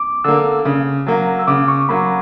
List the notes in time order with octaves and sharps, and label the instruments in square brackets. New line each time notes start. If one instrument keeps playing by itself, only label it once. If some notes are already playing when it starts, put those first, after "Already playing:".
Already playing: [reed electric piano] D6
[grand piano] D3 A#3 [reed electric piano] E6
[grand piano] C#3
F#3 A#3
[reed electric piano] E6
[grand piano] C#3 [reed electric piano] D6
[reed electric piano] C#6
[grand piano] F#3 A#3 [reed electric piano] B5